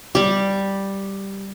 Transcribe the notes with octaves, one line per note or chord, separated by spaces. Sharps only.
G3 G4